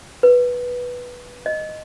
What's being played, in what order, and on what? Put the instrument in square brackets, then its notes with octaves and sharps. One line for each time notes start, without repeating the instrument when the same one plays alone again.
[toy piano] B4
D#5